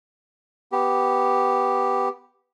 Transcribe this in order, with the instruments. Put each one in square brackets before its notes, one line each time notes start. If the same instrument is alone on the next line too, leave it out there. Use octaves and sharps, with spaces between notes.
[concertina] B3 G4